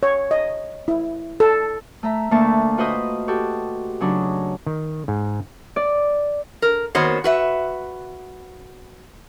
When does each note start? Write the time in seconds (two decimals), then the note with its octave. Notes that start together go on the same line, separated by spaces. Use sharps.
0.03 C#5
0.31 D#5
0.88 E4
1.40 A4
2.03 A3 E5 A#5
2.31 D2 A3 A#3 A5 C#6
2.78 F4 F#4 B4 C5 D#5 D#6
3.28 F#4 G4 A4
4.01 C#3 F#3 D4 D#4
4.67 D#3
5.08 G#2
5.76 D5
6.62 A#4
6.95 D#3 A#3 B3 F#4 C5 C#5
7.24 F#4 B4 E5